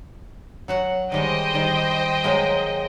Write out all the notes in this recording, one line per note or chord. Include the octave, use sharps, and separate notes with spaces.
F#3 F#4 F#5
D#3 G3 G#3 C5 D#5 G5
D#3 G3
F#3 G#3 A#3